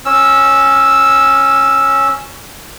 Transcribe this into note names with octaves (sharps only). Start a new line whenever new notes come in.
C#4 E6